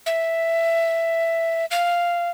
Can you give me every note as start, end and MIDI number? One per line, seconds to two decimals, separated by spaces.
0.06 1.65 76
1.71 2.31 77